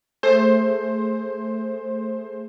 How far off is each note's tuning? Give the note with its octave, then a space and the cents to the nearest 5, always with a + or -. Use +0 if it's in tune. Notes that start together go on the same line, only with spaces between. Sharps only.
A3 +0 G#4 +0 C5 +15